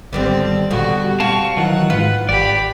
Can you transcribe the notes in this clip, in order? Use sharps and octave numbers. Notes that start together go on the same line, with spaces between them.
G#1 D3 G3 B3 C4 D5
B2 D3 G3 F#4
C4 F5 A5 C#6
D#3 E3 F#3 F#5
G#2 F4 B4
G#1 G4 D5 B5